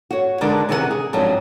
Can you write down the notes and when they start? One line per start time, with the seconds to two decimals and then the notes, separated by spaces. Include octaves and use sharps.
0.11 F#4 C#5
0.41 D3 G#3 D4 D#4 A#4 B4
0.69 C3 D#3 E3 G#4 A#4 F#5
0.91 G#4
1.13 G#2 F3 F#3 G#3 C4 D4